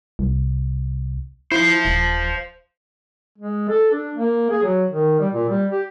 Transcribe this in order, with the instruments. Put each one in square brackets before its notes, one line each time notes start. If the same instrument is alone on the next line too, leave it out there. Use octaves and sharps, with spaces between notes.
[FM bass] C2
[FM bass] E4 [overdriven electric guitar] C5 F5
[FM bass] D#1
[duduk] G#3
A4
D4
A#3
G#4
F#3
D#3
G3
A#2
G3
G4